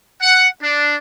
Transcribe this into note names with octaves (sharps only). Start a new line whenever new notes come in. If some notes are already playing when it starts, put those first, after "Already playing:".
F#5
D4